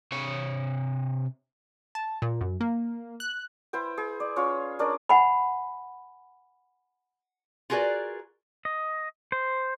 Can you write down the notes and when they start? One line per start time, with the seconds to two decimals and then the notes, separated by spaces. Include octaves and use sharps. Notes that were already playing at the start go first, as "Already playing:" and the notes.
0.12 C3 C#5
1.95 A5
2.22 A#2
2.41 F#2
2.61 A#3
3.20 F#6
3.73 E4 B4 C5 G5
3.98 G#4
4.20 D5
4.36 C#4 F4 C#5
4.79 C#4 D4 A#4 D5
5.09 F#5 G#5 B5
7.70 F4 F#4 G#4 A#4 B4 D5
8.65 D#5
9.32 C5